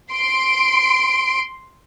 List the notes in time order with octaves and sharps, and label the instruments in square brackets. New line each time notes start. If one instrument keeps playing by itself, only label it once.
[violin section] C6 D7